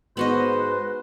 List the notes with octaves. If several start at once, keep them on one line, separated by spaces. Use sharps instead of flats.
G#2 B3 F#4 B4 C5 D#5